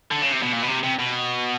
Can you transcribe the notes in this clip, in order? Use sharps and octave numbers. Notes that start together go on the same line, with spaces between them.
D3
C#3
C3
B2
A#2
B2
C3
C3
B2